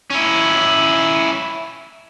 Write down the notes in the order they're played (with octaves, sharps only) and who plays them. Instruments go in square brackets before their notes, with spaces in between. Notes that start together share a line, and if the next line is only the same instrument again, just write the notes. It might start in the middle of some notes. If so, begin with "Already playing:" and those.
[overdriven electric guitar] C#4 E4